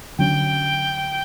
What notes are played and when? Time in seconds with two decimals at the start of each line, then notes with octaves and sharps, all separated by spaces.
0.19 D3 F#3 C#4 G5